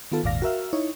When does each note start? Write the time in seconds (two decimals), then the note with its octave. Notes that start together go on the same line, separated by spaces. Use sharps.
0.12 D#3 B3 F4 A4
0.24 G#1 D#2 A#2 D5 F5 A#6
0.42 F#4 A#4 E5 F5
0.73 D#4 E4 C#5